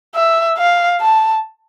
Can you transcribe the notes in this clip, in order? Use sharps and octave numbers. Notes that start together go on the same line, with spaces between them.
E5
F5
A5